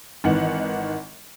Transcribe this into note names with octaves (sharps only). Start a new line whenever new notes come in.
G#1 D#3 E3 F#5